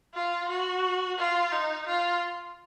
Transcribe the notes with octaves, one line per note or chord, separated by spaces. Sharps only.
F4
F#4
F4
D#4
F4